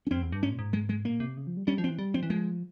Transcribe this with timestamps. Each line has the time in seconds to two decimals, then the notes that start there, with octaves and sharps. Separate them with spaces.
0.07 C#4
0.11 F2 C4
0.22 E2
0.32 G2
0.43 G#2 C#4
0.51 A#2
0.59 G#2
0.73 G#3
0.89 G#3
1.05 A#2 A#3
1.20 C3
1.37 C#3
1.47 F3
1.57 G3
1.67 G3 C#4
1.78 F3
1.84 C4
1.88 E3
1.99 G3
2.14 F3 C4
2.23 E3
2.30 F3 G#3